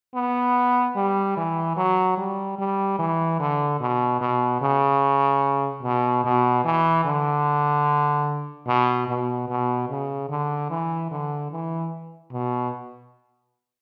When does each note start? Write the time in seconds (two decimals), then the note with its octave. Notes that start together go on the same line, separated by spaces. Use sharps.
0.15 B3
0.96 G3
1.37 E3
1.77 F#3
2.18 G3
2.59 G3
2.99 E3
3.40 D3
3.80 B2
4.21 B2
4.61 C#3
5.83 B2
6.24 B2
6.64 E3
7.05 D3
8.67 B2
9.08 B2
9.49 B2
9.89 C#3
10.29 D3
10.70 E3
11.11 D3
11.52 E3
12.32 B2